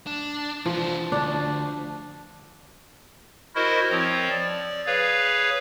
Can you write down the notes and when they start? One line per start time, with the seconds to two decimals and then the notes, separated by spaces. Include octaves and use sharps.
0.07 D4
0.66 E3 F3 D4
1.12 D2 D4
3.55 E4 F#4 A#4 C5 D#5
3.91 F3 C4 C#5
4.29 D5
4.86 G#4 B4 C#5 F5